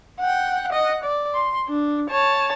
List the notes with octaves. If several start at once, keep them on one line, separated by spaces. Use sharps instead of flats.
F#5 G5
D#5 F#5
D5
C6
D4
C#5 A5